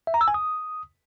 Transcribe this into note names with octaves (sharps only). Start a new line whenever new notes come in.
E5
A#5
E6
G#5
D#6